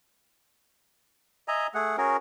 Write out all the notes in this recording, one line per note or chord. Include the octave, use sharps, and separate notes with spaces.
D#5 E5 G#5 A#5
A3 G#4 F#5
C#4 F#4 G#4 A#4